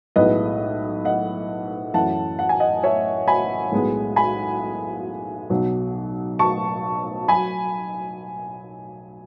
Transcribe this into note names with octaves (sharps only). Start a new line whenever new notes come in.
B1 A2 G#3 B3 E4 B4 D#5
D#5 F#5
F#2 E3 A3 C#4 E4 F#5 A5
F#5
G#5
D#5 F#5
C#5 E5
G#5 B5
B1 A2 G#3 B3
G#5 B5
B1 B2 F#3
A5 C#6
F#3 G#5 B5